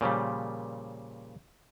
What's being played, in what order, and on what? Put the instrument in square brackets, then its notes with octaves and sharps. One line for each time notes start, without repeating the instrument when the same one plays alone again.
[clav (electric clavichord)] A#2 C#3 F3 G3